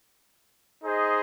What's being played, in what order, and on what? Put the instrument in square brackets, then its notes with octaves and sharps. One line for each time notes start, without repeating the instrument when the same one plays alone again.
[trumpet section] D#4 G#4 C5 D#5